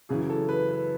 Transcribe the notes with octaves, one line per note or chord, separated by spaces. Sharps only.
F#2 C#3 E3 G#4
A4
B4
B4